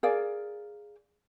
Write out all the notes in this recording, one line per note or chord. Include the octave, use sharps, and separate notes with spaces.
G#4 A#4 D5 F5